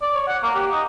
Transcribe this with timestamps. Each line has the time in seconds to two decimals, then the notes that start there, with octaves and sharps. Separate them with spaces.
0.02 D5
0.15 C#5
0.28 F#5
0.43 A#3
0.55 G4
0.72 D#4